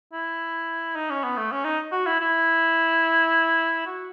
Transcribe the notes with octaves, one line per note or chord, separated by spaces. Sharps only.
E4
D#4
C#4
B3
A3
C#4
D#4
F#4
E4
E4
F#4